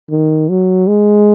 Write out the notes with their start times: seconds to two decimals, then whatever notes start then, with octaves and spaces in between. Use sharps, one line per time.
0.10 D#3
0.49 F#3
0.88 G#3